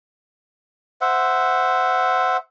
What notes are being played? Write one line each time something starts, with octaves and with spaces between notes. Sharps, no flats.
C5 E5 F#5